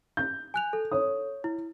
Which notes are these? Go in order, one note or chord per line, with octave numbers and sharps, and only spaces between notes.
G6
G#5 F#6 F7
A4
C#5 D#6
E4